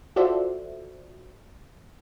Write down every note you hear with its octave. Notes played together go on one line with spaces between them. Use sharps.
F4 F#4 A4 C5 D5 E5